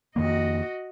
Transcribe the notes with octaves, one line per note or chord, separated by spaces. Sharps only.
F2 D#3 A#3 F#4 D#5